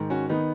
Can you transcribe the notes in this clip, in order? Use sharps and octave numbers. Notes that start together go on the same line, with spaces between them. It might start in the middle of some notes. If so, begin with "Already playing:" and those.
Already playing: G#2 D#3
C#4 F#4
D#3 B3 D#4